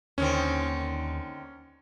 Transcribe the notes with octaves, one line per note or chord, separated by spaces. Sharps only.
D#2 D3 D#3 C4 C#4